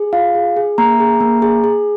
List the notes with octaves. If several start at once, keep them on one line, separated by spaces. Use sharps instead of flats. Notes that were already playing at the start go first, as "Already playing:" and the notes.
Already playing: G#4
F4 F5
G#4
G#4
A#3 A#5
G#4
A#3
G#4
G#4